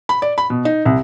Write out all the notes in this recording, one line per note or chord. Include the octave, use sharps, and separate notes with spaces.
B5
D5
B5
B2
D#4
C2